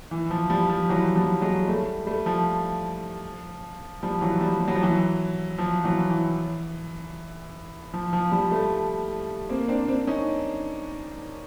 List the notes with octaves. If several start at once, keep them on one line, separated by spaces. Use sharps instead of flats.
E3
F3
F3 G3
F3
E3 F#3
F3 G3
F#3 G#3
G3 A3
G3 A3
F3
F3 G3
E3 F#3
F3 G3
G3
F#3
F3
E3 F#3
F3
E3 F#3
E3
F3
F3
F3 G3
G3 A3
A#3 C4
C4 D4
C4 D4
C#4 D#4